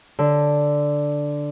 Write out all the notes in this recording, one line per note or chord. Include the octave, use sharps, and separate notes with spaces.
D3